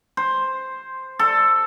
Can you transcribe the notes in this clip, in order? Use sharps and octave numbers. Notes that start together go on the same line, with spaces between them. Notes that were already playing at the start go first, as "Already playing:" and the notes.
C5
A4